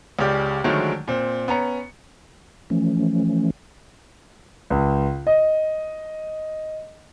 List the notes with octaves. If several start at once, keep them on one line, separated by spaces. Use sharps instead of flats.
C#2 C#3 G4 D5
D3 D#3 F3 F#3 G#3 A3
A#2 C4
B3 C#4 A#5 C#7
E3 F3 A3 C#4
C#2
D#5